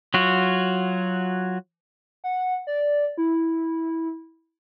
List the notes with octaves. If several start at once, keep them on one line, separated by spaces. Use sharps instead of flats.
F#3 F4 F#4
F#5
D5
E4